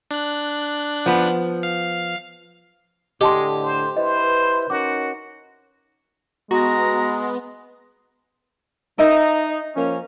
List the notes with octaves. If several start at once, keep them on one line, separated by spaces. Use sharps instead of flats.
D4 F#6
F3 B3
F5
A2 D3 G#3 G4 D#5 A5 C6
C5
E4 B4 C5 D#5
C#4 D#4 F#4 A#4 D6
G#3 B3 F#4 A#5
D#4 A#4 D#5 E5
F3 A#3 C#4